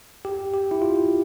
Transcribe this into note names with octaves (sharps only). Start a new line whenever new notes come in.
G4
G4
E4
F4